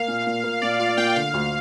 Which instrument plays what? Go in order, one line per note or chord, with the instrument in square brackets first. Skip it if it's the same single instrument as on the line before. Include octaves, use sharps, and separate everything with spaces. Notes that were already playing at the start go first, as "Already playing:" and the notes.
Already playing: [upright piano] A#3 [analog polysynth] F5
[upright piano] A#2
A#2
A#3
[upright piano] A#2 [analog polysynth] D5
[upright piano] F4 [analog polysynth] F5
[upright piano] A#2 [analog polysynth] G5
[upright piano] D3 [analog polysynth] F5
[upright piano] D2